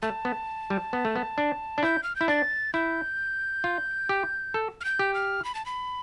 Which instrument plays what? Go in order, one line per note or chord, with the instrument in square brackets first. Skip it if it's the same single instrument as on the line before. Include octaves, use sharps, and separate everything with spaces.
[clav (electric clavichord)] A3 [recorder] A5
[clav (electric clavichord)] B3
G3
B3
A3
B3
D4
D4
[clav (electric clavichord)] E4 [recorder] G6
[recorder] F6
[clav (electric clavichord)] E4 [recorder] G6
[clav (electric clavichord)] D4 [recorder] A6
[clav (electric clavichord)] E4 [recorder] G6
[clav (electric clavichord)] F4
G4
A4
[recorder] F6
G6
[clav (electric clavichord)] G4
[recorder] F6
B5
A5
B5